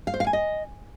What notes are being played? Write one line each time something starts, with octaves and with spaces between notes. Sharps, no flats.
F5
C5
F5
G#5
D#5